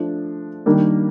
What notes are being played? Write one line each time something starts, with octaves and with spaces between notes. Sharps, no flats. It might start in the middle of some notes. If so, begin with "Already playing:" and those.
Already playing: F3 A3 D4
D#3 G3 A#3 D4